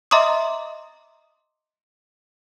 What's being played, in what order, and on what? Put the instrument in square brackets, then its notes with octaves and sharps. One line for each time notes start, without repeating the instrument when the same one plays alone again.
[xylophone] D#5 E5 A#5 C6 D6 D#6